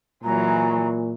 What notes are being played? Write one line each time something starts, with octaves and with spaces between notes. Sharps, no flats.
A#2 E3 F#3 G#3 A#5